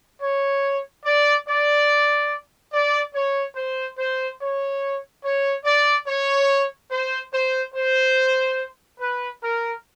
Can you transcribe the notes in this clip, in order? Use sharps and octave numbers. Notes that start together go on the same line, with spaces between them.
C#5
D5
D5
D5
C#5
C5
C5
C#5
C#5
D5
C#5
C5
C5
C5
B4
A#4